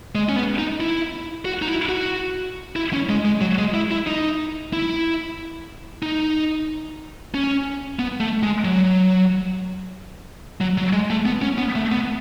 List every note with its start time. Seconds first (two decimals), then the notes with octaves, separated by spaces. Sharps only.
0.15 G#3
0.29 C#4
0.36 B3
0.58 D#4
0.80 E4
1.45 F#4
1.62 D#4
1.68 E4
1.89 F#4
2.76 E4
2.93 C#4
3.09 G#3
3.25 G#3
3.41 F#3
3.58 G#3
3.74 E4
3.91 E4
4.07 D#4
4.73 E4
6.03 D#4
7.34 C#4
7.99 B3
8.20 A3
8.43 G#3
8.65 F#3
10.61 F#3
10.78 F#3
10.93 G#3
11.10 A3
11.26 B3
11.42 C#4
11.58 B3
11.75 A3
11.92 B3